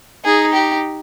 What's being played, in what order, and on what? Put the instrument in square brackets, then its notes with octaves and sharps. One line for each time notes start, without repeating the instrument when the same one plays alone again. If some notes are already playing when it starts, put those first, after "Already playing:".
[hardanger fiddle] D#4 [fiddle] G#4
[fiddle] G4